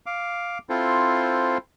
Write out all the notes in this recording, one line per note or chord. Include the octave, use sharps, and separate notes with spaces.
F5 D6
C4 E4 F4 A4 C5